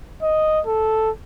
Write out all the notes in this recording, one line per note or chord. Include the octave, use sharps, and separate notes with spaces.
D#5
A4